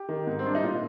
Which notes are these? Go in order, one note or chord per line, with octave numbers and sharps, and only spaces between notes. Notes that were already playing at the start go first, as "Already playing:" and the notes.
Already playing: G4
D#3
G#2
C4
G3 D4
D#4
A#2 F4